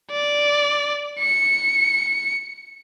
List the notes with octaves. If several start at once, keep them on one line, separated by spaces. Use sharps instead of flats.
D5
C#7